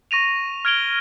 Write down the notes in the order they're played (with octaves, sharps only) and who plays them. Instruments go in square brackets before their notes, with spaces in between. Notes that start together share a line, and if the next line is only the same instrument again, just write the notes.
[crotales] C#6 A#6 D#7 F7
F6 G#6 D7 F7 G7